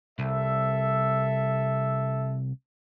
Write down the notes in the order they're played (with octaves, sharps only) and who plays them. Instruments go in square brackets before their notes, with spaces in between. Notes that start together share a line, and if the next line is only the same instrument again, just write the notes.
[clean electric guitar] C2 [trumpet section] A4 E5